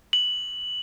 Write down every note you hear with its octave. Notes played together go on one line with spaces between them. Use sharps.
F#7